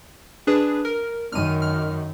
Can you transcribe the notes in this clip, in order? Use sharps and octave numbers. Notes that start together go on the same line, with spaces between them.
D4 G#4 B4
A#4
F#2 D#3 F6 D#7
F6